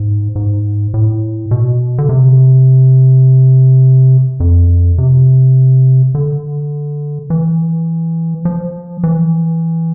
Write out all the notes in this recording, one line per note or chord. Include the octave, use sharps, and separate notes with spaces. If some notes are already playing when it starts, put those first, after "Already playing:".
Already playing: G#2
G#2
A2
B2
D3
C3
F2
C3
D3
E3
F3
E3